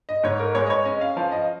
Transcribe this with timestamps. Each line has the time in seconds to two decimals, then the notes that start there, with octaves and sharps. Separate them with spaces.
0.09 D#5
0.23 G#2 C#5
0.39 A#4
0.55 G#3 C#5
0.66 D#5
0.70 C#5
0.85 C#4 D#5
1.01 F5
1.17 F3 F5
1.32 D#5